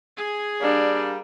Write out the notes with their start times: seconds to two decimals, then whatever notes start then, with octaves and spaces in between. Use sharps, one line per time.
0.17 G#4 G#5
0.61 G3 A#3 D4